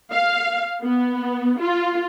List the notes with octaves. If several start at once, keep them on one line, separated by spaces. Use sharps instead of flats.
F5
B3
F4